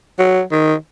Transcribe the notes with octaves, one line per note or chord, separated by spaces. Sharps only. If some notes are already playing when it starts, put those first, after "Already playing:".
F#3
D#3